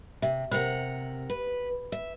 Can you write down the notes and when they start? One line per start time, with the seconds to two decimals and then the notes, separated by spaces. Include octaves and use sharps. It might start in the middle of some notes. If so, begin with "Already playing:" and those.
0.22 C3 E5
0.51 C3 A#4 C5 F#5
1.30 B4
1.92 E5